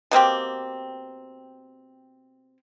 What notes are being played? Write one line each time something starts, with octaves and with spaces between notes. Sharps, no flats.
B2 A#3 C4 G4